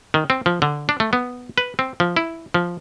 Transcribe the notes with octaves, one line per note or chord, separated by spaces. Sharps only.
D#3
C4
F3
D3
D4
A3
B3
B4
C4
F3
E4
F3